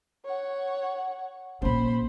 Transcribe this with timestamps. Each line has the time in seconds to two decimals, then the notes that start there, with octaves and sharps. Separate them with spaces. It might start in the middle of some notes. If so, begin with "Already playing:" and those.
0.25 C#5 F#5
1.62 A#1 C#4 C5 B5